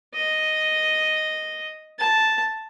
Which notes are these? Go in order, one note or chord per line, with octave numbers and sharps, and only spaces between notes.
D#5
A5